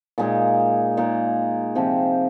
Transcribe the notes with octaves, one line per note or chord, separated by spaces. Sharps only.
A#2 G#3 D#4 A#4
A#2 G#3 D#4 A#4
C3 F3 C4 G4